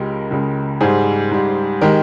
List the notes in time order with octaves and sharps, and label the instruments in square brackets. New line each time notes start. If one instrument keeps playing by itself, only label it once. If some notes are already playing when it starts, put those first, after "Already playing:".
Already playing: [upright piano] C#2 C#3 G#3 G4 A#4
C#2 C#3 G#3
G#2 G3 G#4 C5
G#2 G3
D#3 G#3 G4 A#4